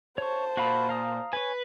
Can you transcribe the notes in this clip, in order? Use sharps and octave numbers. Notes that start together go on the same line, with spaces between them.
C5 C#5 A5 C#6
A#2 F#4 F5 B5
F5 A#5 D#6
B4 C#5 G#5